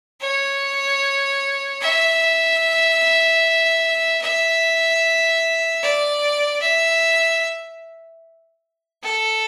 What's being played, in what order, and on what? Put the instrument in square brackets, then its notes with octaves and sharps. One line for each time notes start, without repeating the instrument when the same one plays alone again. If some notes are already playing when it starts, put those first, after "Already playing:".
[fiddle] C#5
E5
E5
D5
E5
A4